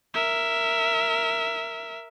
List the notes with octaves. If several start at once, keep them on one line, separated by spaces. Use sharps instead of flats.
A#4 E5